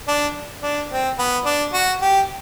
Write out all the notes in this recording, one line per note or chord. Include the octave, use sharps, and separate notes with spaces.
D4
D4
C4
B3
D4
F#4
G4